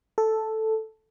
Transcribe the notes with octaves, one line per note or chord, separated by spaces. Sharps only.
A4